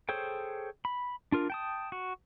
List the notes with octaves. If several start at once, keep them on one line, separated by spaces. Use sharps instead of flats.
G#4 A4 C5 C#5 G5
B5
D4 F4 A#4
G5 A5 D#6
F#4